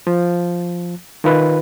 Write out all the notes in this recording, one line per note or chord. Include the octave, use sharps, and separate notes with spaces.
F3
D#3 F4 B4